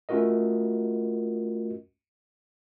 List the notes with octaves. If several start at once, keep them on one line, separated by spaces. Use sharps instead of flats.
A3 C#4 F4 F#4 A#4 D#5